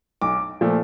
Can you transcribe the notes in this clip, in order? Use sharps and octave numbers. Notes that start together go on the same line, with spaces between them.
B1 D6
A#2 F3 A3